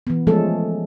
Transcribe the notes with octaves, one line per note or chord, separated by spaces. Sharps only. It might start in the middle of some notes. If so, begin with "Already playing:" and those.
E3 B3
F3 G#3 A3 C#4 A4